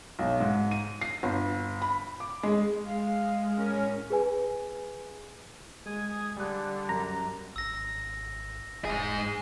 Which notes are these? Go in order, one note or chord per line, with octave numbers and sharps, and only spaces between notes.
B1
G#2
D#7
C7
G1
B5
D6
G#3
G#3 F5
A2 C#4 A#4
G#4 B4 G#5
G#3 G#5 D#6 G#6
D3 G3 F#6
F#2 A#5
G#1 E6 A#6
E1 G#2 G#4